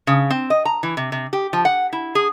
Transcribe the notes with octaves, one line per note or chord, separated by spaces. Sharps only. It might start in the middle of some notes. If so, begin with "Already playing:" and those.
C#3
C4
D#5
A#5
E3
C3
C3
G4
F3
F#5
E4
G#4